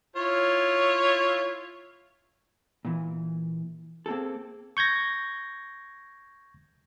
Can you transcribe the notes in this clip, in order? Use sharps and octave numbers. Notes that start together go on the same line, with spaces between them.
E4 F4 C#5
A#2 E3
A#3 C4 G#4 A4
C#6 G6 G#6 A#6